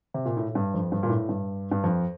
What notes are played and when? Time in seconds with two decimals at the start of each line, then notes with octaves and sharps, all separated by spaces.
0.14 C3
0.25 A#2
0.37 A2
0.49 A2
0.55 G2
0.74 F2
0.92 G2
1.03 A#2
1.10 A2
1.29 G2
1.72 G2
1.83 F2